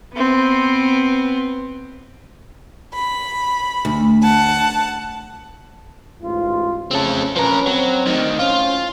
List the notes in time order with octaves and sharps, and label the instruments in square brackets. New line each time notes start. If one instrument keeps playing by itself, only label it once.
[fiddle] B3 C4
[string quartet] B5
[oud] D2
[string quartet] F#5 A5
[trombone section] A1 G#2 F4
[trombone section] C#3 A3 [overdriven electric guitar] C4 A4
[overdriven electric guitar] F3 A#4 [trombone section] C#4 B4
[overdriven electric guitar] F#3 [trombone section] C4
[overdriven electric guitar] D2 D#3
[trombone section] A2 C#4 C5 [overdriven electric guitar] F4